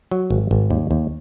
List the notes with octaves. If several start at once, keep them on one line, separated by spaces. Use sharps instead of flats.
F#3
G#1
G#1
D#2
D#2